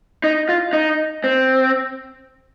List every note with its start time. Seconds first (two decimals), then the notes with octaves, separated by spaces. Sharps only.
0.24 D#4
0.49 F4
0.73 D#4
1.24 C4